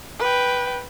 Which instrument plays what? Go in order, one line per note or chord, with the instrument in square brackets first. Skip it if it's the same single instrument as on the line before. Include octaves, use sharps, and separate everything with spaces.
[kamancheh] B4 G5